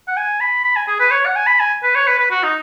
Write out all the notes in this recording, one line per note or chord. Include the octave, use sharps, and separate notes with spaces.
F#5
G#5
B5
B5
G#5
G#4
B4
C#5
F#5
G#5
B5
G#5
B4
C#5
B4
B4
F#4
D#4